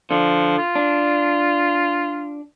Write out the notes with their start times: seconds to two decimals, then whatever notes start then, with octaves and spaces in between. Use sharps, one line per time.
0.11 D3 F3
0.58 F4
0.75 D4